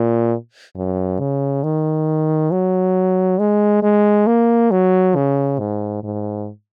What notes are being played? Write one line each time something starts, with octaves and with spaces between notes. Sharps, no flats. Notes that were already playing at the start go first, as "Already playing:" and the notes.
Already playing: A#2
F#2
C#3
D#3
F#3
G#3
G#3
A#3
F#3
C#3
G#2
G#2